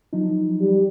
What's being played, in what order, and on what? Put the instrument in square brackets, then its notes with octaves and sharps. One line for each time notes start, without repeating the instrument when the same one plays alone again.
[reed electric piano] F3 F#3 D#4
[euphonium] G3